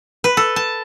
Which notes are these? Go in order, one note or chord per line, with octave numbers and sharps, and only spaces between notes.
B4
A4
A5